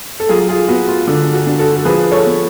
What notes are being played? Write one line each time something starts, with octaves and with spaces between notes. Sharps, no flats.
A4
F#3 F4 G#4
F4 G#4
B3 F#4
F4
D3
F#4
D4
F#4 A4
A4
F3 G#4 B4
A4 C#5
B3